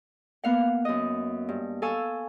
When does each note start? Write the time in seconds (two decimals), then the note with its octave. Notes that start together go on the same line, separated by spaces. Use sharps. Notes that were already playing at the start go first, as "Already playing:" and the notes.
0.44 A#3 B3 F5 F#5
0.85 F#2 D#5
1.49 G2
1.82 A4 F5 G#5 C#6 E6